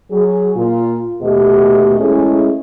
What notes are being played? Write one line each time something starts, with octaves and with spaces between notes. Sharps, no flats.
F#3 G#4
A#2 F4
D#2 B2 A3 G4 D#5
G#3 A3 C#4 E4 G#4